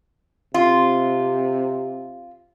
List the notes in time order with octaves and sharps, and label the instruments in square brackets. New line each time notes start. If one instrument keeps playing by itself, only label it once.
[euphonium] C3 [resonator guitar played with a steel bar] F4